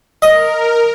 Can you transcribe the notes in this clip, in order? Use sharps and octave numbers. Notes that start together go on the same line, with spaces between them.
A#4 D#5